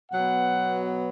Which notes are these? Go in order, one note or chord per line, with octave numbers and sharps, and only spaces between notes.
B2 F#3 B3 F#5